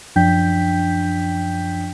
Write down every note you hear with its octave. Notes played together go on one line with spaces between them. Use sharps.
F#2 F3 D4 G5 G6 B6